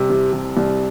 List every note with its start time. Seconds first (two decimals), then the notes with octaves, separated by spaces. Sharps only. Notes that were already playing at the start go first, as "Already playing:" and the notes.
Already playing: C2 C3
0.10 C3
0.33 C3
0.57 C2